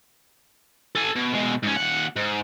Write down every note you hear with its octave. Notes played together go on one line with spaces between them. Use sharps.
A4 G#5
B2
B2 G#3
G#2 C#4
D#2 F#5
G#2